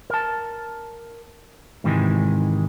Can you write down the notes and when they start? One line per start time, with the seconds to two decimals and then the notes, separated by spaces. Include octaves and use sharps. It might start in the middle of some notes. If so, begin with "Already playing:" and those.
0.10 A#4 A5
1.84 G#2 C3 D#3 E3 G#3